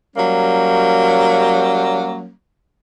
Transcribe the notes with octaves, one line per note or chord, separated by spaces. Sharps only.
F#3 G3 A#3 C#4